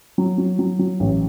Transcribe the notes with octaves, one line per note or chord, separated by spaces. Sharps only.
F#3
F#3
F#3
F#3
A1